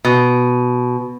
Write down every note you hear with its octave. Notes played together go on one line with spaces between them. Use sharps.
B2